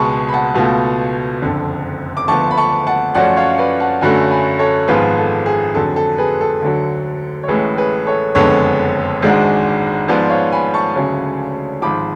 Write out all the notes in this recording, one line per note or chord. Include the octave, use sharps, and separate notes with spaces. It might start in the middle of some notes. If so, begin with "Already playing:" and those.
Already playing: C#2 B2 G#3 A5 B5 C#6
B5
F#5 A5
C#2 B2 A3 F4
F#1 F2 D3
D6
D2 D3 F3 B3 A5 C#6
B5
A5 C#6
F#5 A5
F#2 F3 A3 C#4 F#4 D5 F#5
C#5 F5
F5
B4 D5
F#5 A5
F#2 D3 F#3 A3 G#5 B5
G#5 B5
A4 C#5
G#1 G#2 F3 B3 F4 G#4 B4
A4
G#4
F2 D3 F#3 A4
A4
G#4 B4
A4
D2 D3 F#3
C#5
A1 A2 G#3 G#4 B4
G#4 B4
A4 C#5
F#1 F2 D3 G#3 B3 A4 C#5
G#1 G#2 G#3 D4 F#4
G#2 F3 B3 B4 D5
D5
C#5 F5
G#5 B5
A5 C#6
D2 C#3 F#3 C#4
G#1 G#2 F3 B5 D6